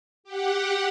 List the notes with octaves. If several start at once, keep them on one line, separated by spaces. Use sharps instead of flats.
G4 F#5